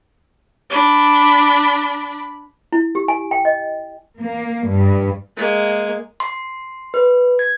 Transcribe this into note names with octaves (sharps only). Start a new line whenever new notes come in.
D4 B5
E4
G4
G#5
G5
D#5
A#3
G2
G#3 A#3
C6
B4
G#6